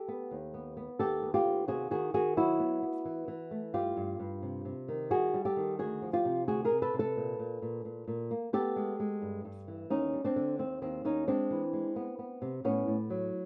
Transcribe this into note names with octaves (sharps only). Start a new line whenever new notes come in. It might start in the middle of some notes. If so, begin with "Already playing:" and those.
Already playing: G4 A4
B3
D#2
B3
B3
D#2 G4 A4
B3
F4 G4
D#2
C3 F#4 G#4
D#3 F#4 G#4
D#3 F#4 G#4
F#3 E4 F#4
B3
B3
E3
E3
A3
G2 F4 G4
G2
G2
C3
C3
D#3
G3 F#4 G#4
G3
G4 A4
D#3
D2 F#4 G#4
F3
F4 G4
C3
D2 F#4 G#4
G#4 A#4
C3
A4 B4
C3
A4 B4
A#2
A#2
A#2
A#2
A#2
A#3
B3 G4 A4
G#3
G#3
G2
G2
E3
D#2 C#4 D#4
G3
C4 D4
D3
D#2 C4
D#2 C4
D#2 C#4 D#4
G#3 C4 D4
E3
G#3
B3
B3
C3
A2 B3 C#4
A2
F#3